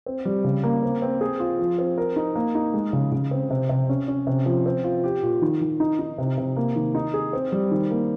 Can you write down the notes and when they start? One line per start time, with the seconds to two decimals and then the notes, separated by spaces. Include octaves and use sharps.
0.06 C4
0.25 G3
0.44 C#3
0.64 A#3
0.83 C4
1.02 C4
1.21 G#4
1.40 F4
1.59 F3
1.78 C4
1.98 A#4
2.16 D#4
2.36 A#3
2.55 D#4
2.74 G#3
2.93 C#3
3.12 C#3
3.31 C4
3.50 C3
3.69 C3
3.89 C#4
4.08 C#4
4.27 C3
4.46 F3
4.66 C4
4.84 F4
5.04 G4
5.23 A#2
5.42 D#3
5.61 D#3
5.80 D#4
5.99 D#4
6.18 C3
6.38 C3
6.57 A#3
6.76 D#3
6.95 D#4
7.14 G#4
7.33 C4
7.52 G3
7.71 D#3
7.91 A#3